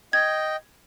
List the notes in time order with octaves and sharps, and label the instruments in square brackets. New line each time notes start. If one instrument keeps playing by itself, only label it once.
[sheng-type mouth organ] D#5 G5 [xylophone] G#6